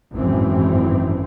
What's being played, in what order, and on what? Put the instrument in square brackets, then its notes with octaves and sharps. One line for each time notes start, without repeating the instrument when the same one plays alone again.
[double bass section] G#1 F#2 A2 E3 C4